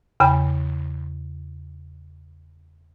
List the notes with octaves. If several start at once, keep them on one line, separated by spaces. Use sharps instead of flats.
E2 C#3 G5 B5